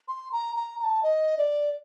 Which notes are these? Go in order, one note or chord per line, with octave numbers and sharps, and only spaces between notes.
C6
A#5
A#5
A#5
A5
D#5
D5